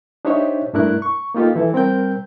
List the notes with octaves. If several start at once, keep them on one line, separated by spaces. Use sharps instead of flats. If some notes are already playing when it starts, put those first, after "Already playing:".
D4 D#4 G4 C5 C#5 E5
G2 A3 D4 E4 A#4 F#6
C#6
A#3 D#4 F4 G4 A4
E3 E4 A4
G3 C4 A#4 G5 G6